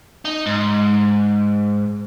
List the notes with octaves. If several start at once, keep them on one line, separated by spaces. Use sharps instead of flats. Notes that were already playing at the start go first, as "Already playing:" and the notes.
D#4
G#2